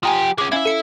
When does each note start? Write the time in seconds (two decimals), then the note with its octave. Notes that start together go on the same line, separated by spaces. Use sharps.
0.03 F3 G4 G#5 A#5 D#6
0.38 G#3 C#4 D6
0.52 C#4 E4 E5 F5 G#6
0.65 A4 C#7